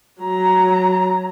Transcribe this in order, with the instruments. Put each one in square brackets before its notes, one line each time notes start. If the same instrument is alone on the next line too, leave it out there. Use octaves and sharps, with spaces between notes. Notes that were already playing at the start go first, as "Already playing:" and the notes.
[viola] F#3 A#5